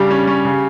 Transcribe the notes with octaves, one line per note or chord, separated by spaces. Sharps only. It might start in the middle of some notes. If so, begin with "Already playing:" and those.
Already playing: C#3 G3 D4 G4
C#4
C#4
C#3